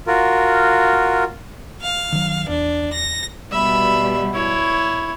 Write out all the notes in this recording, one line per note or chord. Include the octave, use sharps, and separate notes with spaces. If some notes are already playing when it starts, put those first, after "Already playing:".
F4 F#4 A#4
F5
D#3 F#3
E2 D4
A#6
B2 G3 E5 B5
E4 C#5